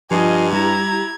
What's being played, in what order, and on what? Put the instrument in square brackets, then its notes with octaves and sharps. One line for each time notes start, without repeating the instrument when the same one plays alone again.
[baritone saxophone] G2 [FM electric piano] F3 C7 [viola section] F4 D#5 [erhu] G#5
[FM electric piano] G3 [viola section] E4 G4 A#5 [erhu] G#6